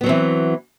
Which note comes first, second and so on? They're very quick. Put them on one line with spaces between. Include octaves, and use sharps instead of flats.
B3 F#3 C4 E3